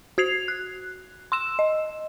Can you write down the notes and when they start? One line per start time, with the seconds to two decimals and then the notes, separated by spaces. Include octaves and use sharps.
0.18 F#4 G#6 C7 F7
0.48 F#6
1.32 C6 E6 E7
1.59 D#5